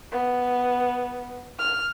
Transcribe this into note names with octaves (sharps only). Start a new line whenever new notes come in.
B3
F6